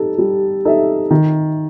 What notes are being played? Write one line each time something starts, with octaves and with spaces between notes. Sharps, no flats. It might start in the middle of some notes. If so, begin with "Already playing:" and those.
Already playing: G3 D#4 A4
G3
D#4 A4 E5
D#3